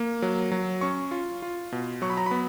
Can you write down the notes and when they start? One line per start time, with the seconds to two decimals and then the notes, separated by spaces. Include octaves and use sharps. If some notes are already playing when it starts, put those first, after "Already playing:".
Already playing: A#3
0.22 F#3
0.52 F#3
0.81 C#4 C#6
1.11 F4
1.42 F4
1.72 B2
2.02 F#3 C#6
2.10 B5
2.17 A#5
2.26 B3 B5